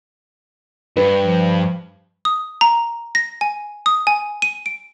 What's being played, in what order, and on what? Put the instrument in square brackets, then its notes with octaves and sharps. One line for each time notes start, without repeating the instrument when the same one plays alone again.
[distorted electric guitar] G2 [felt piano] B4
[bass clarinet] F3
[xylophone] D#6
A#5
A#6
G#5
D#6
G#5
D#7
D7